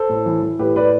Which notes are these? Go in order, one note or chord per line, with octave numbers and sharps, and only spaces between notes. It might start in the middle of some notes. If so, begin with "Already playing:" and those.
Already playing: A4 C5
A2
E3
E3
A2 G4 B4
A2 B4 D5